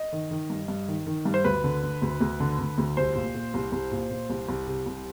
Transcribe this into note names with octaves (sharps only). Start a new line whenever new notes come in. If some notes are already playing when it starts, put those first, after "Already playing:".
Already playing: D#5
D#3
D#3
G2
G2
D#3
D#3
G2
C5
D2 B4
D3
D3
D2
D2
D3
D3
D2
C2 C5
A#2
A#2
C2
C2
A#2
A#2
C2
C2
C3
C2